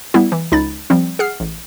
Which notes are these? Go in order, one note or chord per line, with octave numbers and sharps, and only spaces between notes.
G3 B3 E4
E3
C#2 D#4 B5 A6
F3 G3 C4
G#4 F#5 F6 C7
A1